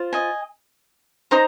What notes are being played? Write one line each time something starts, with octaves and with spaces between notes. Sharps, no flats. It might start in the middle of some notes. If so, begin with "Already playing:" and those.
Already playing: F4 C5
D#5 G#5
D#4 C5 A#5 D#6